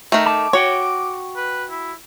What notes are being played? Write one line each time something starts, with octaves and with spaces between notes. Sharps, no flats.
D#3 A3 A#5
A5 D6
F#4 C#5 F#5 G5
B4
E4